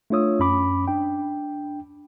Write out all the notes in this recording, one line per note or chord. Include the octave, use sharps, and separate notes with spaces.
A3 D4 F4 C#5 D#6 E6
F#2 C#4 B5 D6
D4 G5